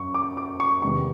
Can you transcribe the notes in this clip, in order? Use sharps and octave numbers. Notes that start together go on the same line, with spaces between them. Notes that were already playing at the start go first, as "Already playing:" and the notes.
Already playing: F#2 C#4 C#6
D6
D6
C#6
E2 C3 D#3 G#3 B3 C#6